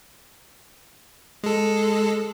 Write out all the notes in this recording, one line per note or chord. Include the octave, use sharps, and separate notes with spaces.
G#3 A4